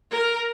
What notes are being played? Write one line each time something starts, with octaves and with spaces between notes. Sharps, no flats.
A#4